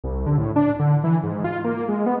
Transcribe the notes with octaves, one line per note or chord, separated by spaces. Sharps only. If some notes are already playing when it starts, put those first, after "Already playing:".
C2
D3
A2
D4
D3
E3
G#2
F4
A#3
G#3
B3